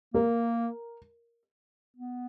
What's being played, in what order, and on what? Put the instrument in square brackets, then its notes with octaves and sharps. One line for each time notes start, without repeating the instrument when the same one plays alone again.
[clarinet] A#3 [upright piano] A#4
[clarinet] B3